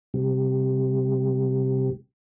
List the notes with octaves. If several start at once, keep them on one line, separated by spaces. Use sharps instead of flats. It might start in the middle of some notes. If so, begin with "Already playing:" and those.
C3 G3